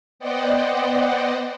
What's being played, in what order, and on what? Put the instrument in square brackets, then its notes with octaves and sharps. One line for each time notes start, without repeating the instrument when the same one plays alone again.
[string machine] B3 C5 D5 D#5 F#5 G5